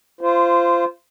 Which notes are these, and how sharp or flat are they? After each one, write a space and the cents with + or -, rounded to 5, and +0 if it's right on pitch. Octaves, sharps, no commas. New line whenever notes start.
F4 -25 C5 -10